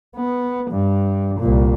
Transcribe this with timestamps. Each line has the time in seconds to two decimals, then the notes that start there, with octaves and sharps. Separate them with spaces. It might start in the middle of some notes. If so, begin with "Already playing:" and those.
0.16 B3
0.71 G2
1.40 C2 A#2